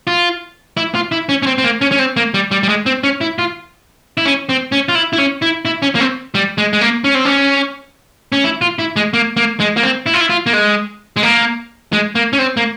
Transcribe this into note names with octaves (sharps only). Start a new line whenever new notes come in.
F4
E4
F4
E4
C#4
C#4
C4
C4
A#3
C#4
C#4
C4
A#3
G3
G3
G3
G#3
C4
C#4
E4
F4
E4
C#4
C4
C#4
F4
E4
E4
C#4
E4
E4
C#4
A#3
C4
G3
G#3
G#3
A#3
C#4
C4
C#4
C#4
E4
F4
E4
G#3
A#3
A#3
G#3
A#3
C4
E4
F4
E4
F4
A#3
G#3
G#3
A#3
G#3
A#3
C#4
C4
A#3